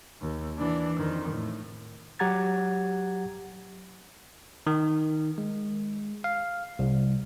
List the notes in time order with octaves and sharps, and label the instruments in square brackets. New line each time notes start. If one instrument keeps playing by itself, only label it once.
[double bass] D#2
E3 D4
F2 D#3
A2
[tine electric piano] F#3 G4 F#5 A#5 G#6 A6
D#3
G#3
F5
C2